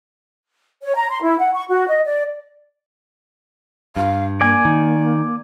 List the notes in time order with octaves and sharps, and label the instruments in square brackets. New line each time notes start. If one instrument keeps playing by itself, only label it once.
[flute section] C#5
A#5
C6
E4
F#5
C#6
F#4
D#5
D5
[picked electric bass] G2 [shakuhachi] F5
[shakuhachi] A#3 [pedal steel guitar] D5 G#5
[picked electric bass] D#3